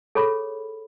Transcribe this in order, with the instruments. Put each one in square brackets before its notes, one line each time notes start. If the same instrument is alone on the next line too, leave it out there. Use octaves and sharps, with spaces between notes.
[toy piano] G#4 A4 C#5 B5